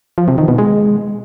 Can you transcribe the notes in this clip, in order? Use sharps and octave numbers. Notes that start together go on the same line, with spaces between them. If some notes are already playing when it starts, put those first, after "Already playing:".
F3
C3
D#3
B2
G#3